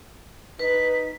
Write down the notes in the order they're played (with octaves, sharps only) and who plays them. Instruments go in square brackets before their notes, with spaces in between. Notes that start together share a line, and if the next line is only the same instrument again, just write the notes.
[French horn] D#4 [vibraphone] B4 [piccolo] B6